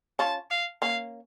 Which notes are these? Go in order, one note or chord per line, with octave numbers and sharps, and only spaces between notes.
C#4 F4 A5
F5
A#3 C#4 F5